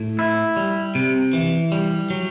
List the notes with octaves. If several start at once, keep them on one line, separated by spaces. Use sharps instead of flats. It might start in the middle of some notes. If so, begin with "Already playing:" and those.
Already playing: A2
E4
G3
C3
E3
G3
F#3